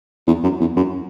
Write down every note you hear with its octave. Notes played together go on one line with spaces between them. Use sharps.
E2
F#2
E2
F#2